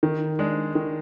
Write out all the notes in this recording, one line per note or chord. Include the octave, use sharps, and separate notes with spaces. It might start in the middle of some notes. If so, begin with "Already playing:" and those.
D#3
G#3 D4
D#3